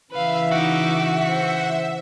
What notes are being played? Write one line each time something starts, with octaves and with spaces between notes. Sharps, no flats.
C#3 E3 B4 E5 F5
D#4 F#4 D6
C5